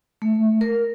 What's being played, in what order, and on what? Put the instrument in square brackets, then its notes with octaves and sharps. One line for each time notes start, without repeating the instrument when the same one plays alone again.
[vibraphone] A3
A#4